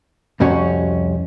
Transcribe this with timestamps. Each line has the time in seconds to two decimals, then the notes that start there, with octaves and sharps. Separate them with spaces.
0.40 C2 F2 C3 C#4 F#4 C#5